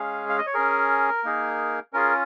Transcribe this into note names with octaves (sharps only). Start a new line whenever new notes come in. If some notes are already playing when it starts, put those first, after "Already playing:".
Already playing: G#3 C#4 G#4 F5
F5
D#5
C#5
C#4 G#4 A#4
A#3 D#4 G#4
C#4 F4 G#4 A#4